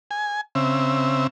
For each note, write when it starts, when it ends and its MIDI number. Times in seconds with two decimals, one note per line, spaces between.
0.11 0.41 80
0.55 1.27 49
0.55 1.27 60
0.55 1.27 76